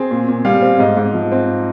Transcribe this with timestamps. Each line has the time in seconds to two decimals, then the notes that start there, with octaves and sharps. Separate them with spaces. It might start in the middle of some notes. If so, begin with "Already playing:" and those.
Already playing: C4 G#4
0.11 A#2
0.28 A#2
0.45 G3 F5
0.62 C4
0.79 G#2 D#5
0.97 G#2
1.14 F3
1.32 C4